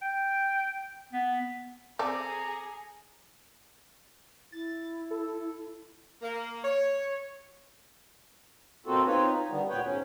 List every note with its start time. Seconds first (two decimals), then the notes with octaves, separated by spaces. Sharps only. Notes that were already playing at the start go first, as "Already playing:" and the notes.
0.02 G5
1.13 B3
1.99 C4 G#4 A4 D5 A#5 D6
4.52 E4 A6
5.11 A4
6.22 A#3
6.63 C#5
8.86 B2 A#3 C4 F4 F#4 A4
9.06 C4 D#4 F4 B4 C#5
9.31 D#4
9.49 D3 D#3 G3 B3
9.69 D2 A#2 B3 B4 C#5 G5
9.84 G#2 C#4